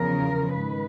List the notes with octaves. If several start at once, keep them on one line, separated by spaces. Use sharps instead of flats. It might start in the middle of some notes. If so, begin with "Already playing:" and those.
Already playing: E2 C#3 F3 A#4
G#2 D#3 B4